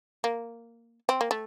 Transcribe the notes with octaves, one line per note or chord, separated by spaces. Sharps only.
A#3
C4
A#3
A3